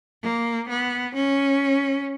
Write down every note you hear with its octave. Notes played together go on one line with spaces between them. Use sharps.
A#3
B3
C#4